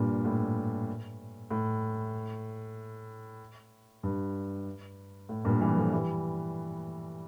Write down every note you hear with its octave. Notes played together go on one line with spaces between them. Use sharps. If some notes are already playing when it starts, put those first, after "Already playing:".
Already playing: G2 A#2
A2
A2
G2
A2
G2 A#2
E3 G3
F3 A3
E3 G3